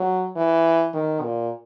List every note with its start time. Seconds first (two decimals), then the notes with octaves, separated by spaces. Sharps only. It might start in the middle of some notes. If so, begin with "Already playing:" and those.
Already playing: F#3
0.37 E3
0.94 D#3
1.23 A#2